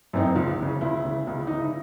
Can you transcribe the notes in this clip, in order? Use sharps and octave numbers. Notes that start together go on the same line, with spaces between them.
F#2 E3 C4 D#4
C#2
C#3 E3
C#2 E4
C#3 E3
C#2
C#3 E3 D#4
E4